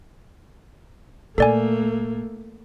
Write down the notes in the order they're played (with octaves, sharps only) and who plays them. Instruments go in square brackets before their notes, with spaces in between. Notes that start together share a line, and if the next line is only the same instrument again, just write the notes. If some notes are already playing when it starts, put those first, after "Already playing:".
[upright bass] A#2 [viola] A3 A#3 [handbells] A4 D5 G#5